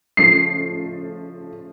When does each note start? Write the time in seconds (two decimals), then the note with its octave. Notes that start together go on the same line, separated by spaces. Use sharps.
0.17 C#3 F3 A3 C7